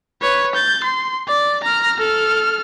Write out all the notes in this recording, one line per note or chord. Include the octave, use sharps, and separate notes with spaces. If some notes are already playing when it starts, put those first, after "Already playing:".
B4 C#5
G6 A6
C6
D5
A#5 F6
A4 F6